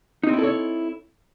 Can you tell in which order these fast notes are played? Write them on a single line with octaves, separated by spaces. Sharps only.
D#4 C4 E4 A4 C#5